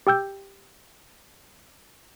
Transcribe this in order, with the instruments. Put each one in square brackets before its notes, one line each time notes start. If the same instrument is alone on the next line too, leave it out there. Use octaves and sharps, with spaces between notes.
[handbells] G4 G5 E6 G6